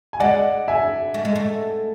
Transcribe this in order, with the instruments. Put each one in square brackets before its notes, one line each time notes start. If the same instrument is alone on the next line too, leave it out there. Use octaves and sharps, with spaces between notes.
[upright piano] G#5
[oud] G#3 [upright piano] D5 F#5
[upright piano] E5 G#5
[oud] A3
G#3
A3